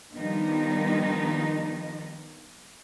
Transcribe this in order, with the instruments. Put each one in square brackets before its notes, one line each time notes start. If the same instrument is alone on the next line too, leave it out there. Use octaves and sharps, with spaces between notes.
[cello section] D#3 F3 G3 B3 D4 D#4